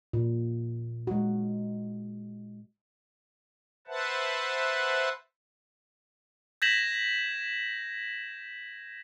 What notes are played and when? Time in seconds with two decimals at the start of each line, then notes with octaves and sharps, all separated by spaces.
0.13 A#2
1.07 G#3 F#4
3.87 B4 C5 E5 F#5 A5
6.62 G6 G#6 A#6 B6 E7 F#7